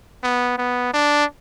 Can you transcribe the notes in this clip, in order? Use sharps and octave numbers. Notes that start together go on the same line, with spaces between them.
B3
B3
D4